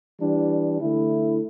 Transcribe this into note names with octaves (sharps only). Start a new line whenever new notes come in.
E3 G3 D4
D3 A3 E4